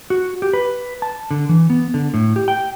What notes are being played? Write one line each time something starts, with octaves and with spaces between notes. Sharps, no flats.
F#4
G4
B4
A5
D3
E3
B3
D3
A2
G4
G5